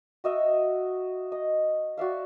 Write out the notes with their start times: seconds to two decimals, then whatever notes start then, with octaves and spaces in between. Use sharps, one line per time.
0.24 F#4 D#5 E5
1.32 D#5
1.97 F#4 D5 E5 F5